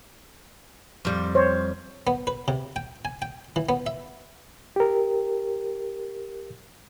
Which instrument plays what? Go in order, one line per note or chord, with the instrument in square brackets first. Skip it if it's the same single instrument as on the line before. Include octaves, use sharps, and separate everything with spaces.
[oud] F2 G3
[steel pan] C5 C#5
[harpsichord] B3
B4
C3
G5
G#5
G5
E3
B3
E5
[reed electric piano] G4 A#4